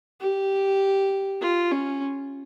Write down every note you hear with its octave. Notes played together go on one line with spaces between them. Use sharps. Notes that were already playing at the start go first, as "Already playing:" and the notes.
G4
F4
C#4